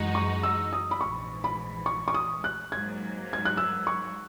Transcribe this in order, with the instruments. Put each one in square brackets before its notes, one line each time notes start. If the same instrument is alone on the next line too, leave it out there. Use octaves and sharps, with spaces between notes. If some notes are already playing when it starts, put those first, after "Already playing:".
Already playing: [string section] F#2 E3 G#3 D#4 F#4
[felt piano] C#6
E6
D#6
B5
[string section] A#1 G#2 E3 [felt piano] C#6
[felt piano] B5
C#6
C#6
D#6
F#6
[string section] G#2 F#3 A#3 [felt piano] G#6
[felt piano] G#6
F#6
E6
C#6